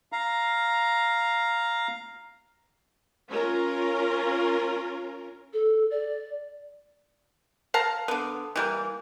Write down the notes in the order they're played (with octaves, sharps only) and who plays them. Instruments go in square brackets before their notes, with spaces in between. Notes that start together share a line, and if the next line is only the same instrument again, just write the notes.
[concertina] F5 A#5
[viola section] C#4 F4 A#4
[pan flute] A4
D5
[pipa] F5 A5 A#5
D3 B3
E3 G3 A#3